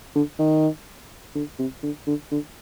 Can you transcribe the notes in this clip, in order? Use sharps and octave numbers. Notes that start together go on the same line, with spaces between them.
D3
D#3
D3
C3
D3
D3
D3